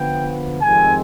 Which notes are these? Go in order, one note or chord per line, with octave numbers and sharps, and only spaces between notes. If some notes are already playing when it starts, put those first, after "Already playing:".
Already playing: D3 F3 B3 G5
F2 C3 D#3 G#3 C4 G#5